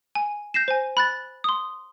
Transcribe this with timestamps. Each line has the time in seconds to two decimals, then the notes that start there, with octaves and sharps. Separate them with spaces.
0.15 G#5
0.54 G6 A#6 C7 E7
0.68 C5 G#5
0.97 B5 F#6 A6
1.44 C6 D#6